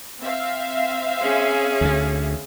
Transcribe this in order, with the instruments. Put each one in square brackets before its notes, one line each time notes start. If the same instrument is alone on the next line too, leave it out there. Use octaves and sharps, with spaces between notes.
[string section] C4 E5 F5
[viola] C#4 G#4
[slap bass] D2 D3